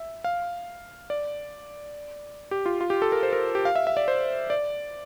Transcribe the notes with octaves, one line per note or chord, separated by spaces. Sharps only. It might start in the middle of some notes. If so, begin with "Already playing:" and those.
Already playing: E5
F5
D5
G4
F4
F4
G4
A4
A#4
C5
A#4
G4
F5
E5
E5
D5
C5
D5